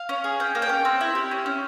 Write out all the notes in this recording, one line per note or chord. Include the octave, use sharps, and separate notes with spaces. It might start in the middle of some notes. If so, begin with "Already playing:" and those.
Already playing: F5
C#4
G#4
C#4 G5
A#3
G5
C#4
C4
E4
G4
C#4
C#4